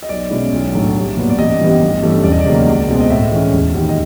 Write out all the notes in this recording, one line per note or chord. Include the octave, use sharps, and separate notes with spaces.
D#5
B1 D5
B2 G#3 C#4 E4
B1
A2 F#3 A3 D4
C2
A#2 F#3 B3
D5
A1 D#5
G2 E3 G3 B3
G1
G2 E3 A3 C#4
E1 D5
D#5
D5
D#2 C#3 F#3 A#3
C#2
B2 G#3 C4
D#5
A2 E5
E3 G#3 C#4
E1
D#2 D#3
D#5